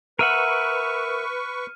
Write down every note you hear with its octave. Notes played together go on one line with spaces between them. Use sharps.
A#4 B4 E5 F#5 C#6 F6 D#7